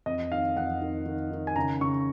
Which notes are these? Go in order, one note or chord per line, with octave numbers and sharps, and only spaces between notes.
F2 D#5
D#3 F5
F2 F#5
D#3
D#3
D#3
G#5
C#3 A#5
C#3 C#6